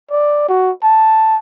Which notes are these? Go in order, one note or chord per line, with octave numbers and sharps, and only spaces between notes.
D5
F#4
A5